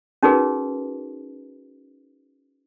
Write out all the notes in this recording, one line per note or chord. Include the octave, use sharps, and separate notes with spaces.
C#4 D#4 F#4 G#4 A#4 B4